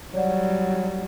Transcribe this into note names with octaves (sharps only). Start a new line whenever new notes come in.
F#3 G3 C#5 D5 F#5